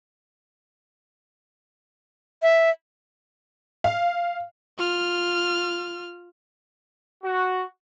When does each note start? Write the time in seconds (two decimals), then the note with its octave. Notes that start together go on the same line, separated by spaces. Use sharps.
2.43 E5
3.84 F5
4.78 F4 F6
7.24 F#4